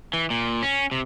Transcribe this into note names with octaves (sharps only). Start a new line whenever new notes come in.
E3
A#2
C#4
C3